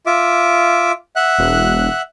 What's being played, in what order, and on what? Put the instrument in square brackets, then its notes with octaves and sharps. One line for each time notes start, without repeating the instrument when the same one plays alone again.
[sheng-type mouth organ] F4 E5 D6
E5 F#5 F#6
[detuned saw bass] E1